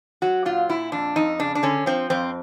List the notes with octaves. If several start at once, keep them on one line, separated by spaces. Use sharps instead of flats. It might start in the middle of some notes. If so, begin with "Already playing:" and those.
F#3 F#4
A#2 F4
A#2 E4
F2 D4
F2 D#4
C#3 D4
D4
D3 C#4
F3 C4
F2 C4